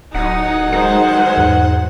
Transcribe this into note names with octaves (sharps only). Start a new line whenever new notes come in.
D1 F#3 D#4 F#5
D#3 G#3 D#4 C5
E2 G#2